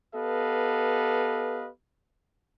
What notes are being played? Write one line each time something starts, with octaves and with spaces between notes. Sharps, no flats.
B3 G4 A4 B4 D#5 F5